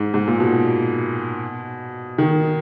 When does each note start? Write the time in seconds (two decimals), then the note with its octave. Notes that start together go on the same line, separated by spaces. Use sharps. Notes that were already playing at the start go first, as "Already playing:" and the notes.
Already playing: G#2
0.14 G#2
0.27 A#2
0.40 B2
2.18 D#3